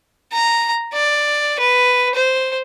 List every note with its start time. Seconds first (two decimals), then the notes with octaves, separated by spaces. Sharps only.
0.32 A#5
0.93 D5
1.59 B4
2.14 C5